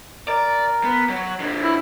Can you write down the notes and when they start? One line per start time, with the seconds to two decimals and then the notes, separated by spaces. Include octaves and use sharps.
0.28 A#4 D5
0.84 B3
1.09 F#3
1.40 A#2 D3
1.63 E4